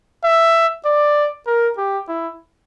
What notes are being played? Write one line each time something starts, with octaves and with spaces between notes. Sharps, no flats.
E5
D5
A#4
G4
E4